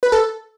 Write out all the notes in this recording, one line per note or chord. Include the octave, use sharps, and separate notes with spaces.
B4
A4